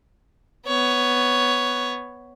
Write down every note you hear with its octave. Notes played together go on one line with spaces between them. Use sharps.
B3 C#5